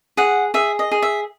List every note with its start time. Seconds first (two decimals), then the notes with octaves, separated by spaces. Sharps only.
0.17 G#4 F#5
0.54 G#4 E5
0.79 D#5
0.92 G#4
1.02 E5